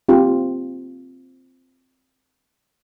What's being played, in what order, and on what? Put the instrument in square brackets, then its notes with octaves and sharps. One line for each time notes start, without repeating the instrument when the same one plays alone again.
[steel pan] C4 F4 G4